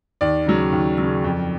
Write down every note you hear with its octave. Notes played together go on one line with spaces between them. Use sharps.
D#2 D5
C#3 F#3
D#2
C#3 F#3
F2